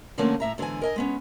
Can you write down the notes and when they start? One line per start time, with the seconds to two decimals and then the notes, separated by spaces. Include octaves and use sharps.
0.18 D3 F3 A3 A#3 C4 C#4
0.40 A2 E5 A#5
0.58 G#2 D3 E3 B3 G#5
0.82 A#4 D#5 G#5
0.96 G#3 B3 C#4